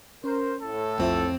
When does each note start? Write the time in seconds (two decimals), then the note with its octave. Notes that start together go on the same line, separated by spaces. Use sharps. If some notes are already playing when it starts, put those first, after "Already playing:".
0.24 C#4 A#4 C5
0.61 A2 A4
0.98 B1 F2 F3 C4 E5